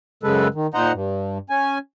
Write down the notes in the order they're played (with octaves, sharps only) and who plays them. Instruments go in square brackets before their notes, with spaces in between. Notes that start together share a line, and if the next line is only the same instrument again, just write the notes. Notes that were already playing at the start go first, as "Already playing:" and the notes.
[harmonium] F#2 C#3 G#3 A4 B4
D#3
A#2 D#4 C5 D#5 F#5 A#5
G2
C#4 G#5